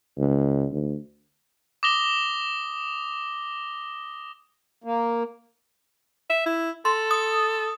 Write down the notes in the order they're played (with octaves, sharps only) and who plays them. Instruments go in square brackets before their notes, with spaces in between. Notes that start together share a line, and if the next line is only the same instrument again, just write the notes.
[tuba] C#2
D2
[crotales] D6 D#6 A#6 F7 G7
[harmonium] A#3
[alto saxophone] E5
E4
[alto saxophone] A4 [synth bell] C6
[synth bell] D#6